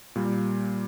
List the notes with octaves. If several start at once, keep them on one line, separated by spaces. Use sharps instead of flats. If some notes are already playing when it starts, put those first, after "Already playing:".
A#2 G3 A#3